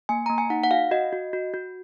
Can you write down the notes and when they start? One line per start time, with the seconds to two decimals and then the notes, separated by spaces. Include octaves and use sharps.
0.09 A#3 G#5
0.26 A#3 A#5
0.38 G#5
0.50 D#4 F#5
0.64 F#5
0.71 F#4 F5
0.91 F#4 D#5
1.13 F#4
1.33 F#4
1.54 F#4